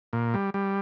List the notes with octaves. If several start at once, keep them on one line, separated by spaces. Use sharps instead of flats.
A#2
G3
G3